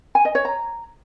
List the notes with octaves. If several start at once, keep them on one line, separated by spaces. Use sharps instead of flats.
G#5
D#5
C#5
A#5